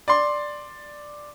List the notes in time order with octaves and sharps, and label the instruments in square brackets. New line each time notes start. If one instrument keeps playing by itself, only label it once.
[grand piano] D5 C6